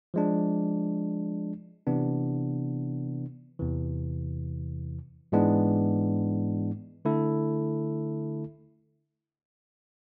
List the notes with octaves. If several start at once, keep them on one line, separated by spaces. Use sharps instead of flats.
F3 G#3 D4
C3 E3 B3 D4
E2 C3 E3
G#2 E3 G#3 B3 D4
D3 A3 E4 A4